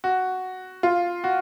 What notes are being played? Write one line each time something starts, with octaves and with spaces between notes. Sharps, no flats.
F#4
F4
F#4